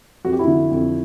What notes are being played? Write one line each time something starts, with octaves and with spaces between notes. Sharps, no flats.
F2 F#4
G4
E4 F#4
D3
F2